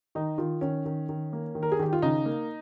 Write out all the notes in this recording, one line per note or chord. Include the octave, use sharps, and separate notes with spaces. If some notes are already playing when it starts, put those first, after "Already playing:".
D#3 D#4
D#3 F4
D#3 C#4
D#3
D#3
A#3
D#3
A#4
G#4
D#3 G4
F4
C#3 D#4
A#3